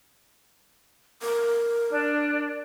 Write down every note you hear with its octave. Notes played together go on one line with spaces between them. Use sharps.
A#4
D4